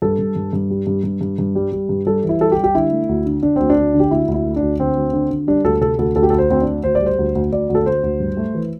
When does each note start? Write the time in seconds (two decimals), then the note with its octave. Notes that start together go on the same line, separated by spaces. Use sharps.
0.02 G2 A4
0.19 G2
0.36 G2
0.53 G2
0.70 G3
0.87 G2
1.04 G2
1.21 G2
1.39 G2
1.55 G3
1.72 G3
1.89 G2
2.06 G3 A4
2.23 E3
2.29 E4
2.41 G3 A4
2.52 G4
2.58 G3
2.64 G4
2.75 D3 E4
2.91 A3
3.09 D2
3.26 D3
3.43 D3 D4
3.56 D2 C4
3.70 D4
3.78 D2
3.94 D3
4.00 G4
4.11 D2 E4
4.28 D2
4.34 E4
4.45 A3
4.56 D4
4.62 D2
4.79 D3 C4
4.96 D2
5.13 D3
5.30 D3
5.47 G3 D4
5.64 D2 A4
5.81 C3 A4
5.98 D2 A4
6.16 D2 A4
6.23 G4
6.30 D2 A4
6.38 C5
6.50 D2 C4
6.61 D4
6.67 D2
6.84 D2 C5
6.95 D5
7.01 G3
7.06 C5
7.18 D2
7.35 D2
7.52 D2 D5
7.69 D2
7.75 A4
7.86 D2 C5
8.03 D2
8.20 G2
8.37 A3
8.54 E3